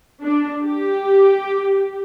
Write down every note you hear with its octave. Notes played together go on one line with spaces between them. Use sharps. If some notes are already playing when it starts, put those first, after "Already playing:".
D4
G4